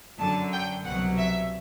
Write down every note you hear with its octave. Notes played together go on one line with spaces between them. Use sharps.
F#2 D3 F#3 A5
G5
C2 B2 F#3 F#5
E5